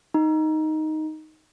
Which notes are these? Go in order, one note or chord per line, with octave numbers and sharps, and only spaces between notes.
D#4